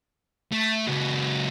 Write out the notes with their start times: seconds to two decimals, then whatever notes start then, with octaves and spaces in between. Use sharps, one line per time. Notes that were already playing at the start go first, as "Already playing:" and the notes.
0.52 A3
0.87 C#2 F#3